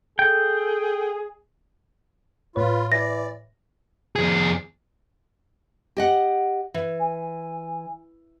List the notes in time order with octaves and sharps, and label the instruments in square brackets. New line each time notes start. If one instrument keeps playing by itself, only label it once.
[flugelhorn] G#4 [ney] A4 [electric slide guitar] G5
[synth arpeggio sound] A2 C#5 [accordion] F4 [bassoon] B4
[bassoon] E3 [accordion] D5 [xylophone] A#6
[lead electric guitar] F2 G#4
[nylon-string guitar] G4 D#5 F#5
E3
[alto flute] G#5